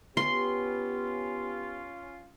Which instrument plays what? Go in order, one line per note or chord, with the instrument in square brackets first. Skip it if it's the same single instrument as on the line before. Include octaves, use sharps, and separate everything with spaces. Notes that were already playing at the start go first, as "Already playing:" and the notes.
[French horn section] B3 G4 [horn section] C#4 F4 [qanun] C6